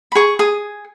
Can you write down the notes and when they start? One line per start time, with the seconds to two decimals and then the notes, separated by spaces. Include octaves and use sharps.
0.12 B5
0.15 G#4 C#6
0.39 G#4 D#6